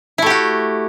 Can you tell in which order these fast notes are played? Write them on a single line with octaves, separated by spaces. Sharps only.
E4 A3 G4 F#4